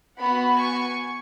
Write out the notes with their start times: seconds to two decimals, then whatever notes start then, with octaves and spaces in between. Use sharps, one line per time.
0.19 B3 F#4 F#5 B5
0.57 G#5 C#6